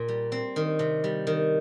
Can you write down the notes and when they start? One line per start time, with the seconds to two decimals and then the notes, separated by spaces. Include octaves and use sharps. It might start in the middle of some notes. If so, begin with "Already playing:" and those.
Already playing: A#2
0.08 G3
0.32 C4
0.56 D#3
0.79 C3
1.04 G3
1.27 D#3